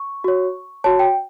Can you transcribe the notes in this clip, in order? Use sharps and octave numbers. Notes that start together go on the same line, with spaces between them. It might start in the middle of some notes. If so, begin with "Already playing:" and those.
Already playing: C#6
F#4 C#5
F#4 C#5 A5
G5